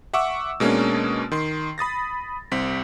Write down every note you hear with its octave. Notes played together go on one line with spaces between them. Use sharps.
E5 F#5 C#6 D6 E6
B2 G#3 A#3 C#4 D4
D#3 C6 C7
B5 D#6 A6 A#6
C2 C4 B6